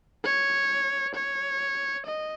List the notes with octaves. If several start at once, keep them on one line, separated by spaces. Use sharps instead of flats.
C#5
C#5
D#5